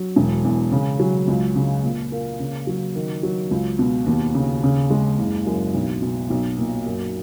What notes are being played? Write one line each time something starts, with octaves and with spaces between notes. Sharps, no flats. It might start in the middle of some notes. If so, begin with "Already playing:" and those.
Already playing: F#3
E1
E2
C#3
F#3
C#2
C#3
A#2
A#3
C#3
F#3
D#3
F#3
C#2
B2
D#2
C#3
C#3
G#3
F#1
F#2
B1
B2
B1
A#2
F#2